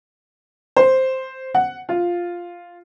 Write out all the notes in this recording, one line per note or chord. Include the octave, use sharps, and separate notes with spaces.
C5
F#5
F4